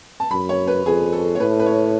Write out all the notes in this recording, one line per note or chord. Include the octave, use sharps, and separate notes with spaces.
A5
F#2 B5
C#5
B4
F2 G#4
A4
C#5
A2 B4
B4
C#5